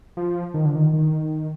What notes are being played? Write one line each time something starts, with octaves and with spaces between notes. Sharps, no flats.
F3
D#3
D3
D#3
D#3